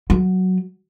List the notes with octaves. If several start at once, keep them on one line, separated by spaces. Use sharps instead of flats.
F#3